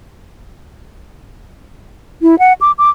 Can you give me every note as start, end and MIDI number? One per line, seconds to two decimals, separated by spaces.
2.22 2.39 64
2.39 2.53 78
2.61 2.72 86
2.78 2.90 86